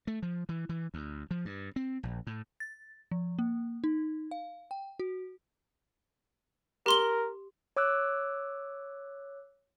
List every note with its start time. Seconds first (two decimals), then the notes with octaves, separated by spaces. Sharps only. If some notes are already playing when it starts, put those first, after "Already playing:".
0.07 A3
0.22 F3
0.49 E3
0.69 E3
0.94 D2
1.31 F3
1.45 G2
1.76 C4
2.03 A#1
2.27 A2
2.60 A6
3.11 F3
3.39 A#3
3.84 D#4
4.31 F5
4.71 G5
4.99 F#4
6.86 G4 A#4 C6 G7
7.77 C#5 D6 E6 F#6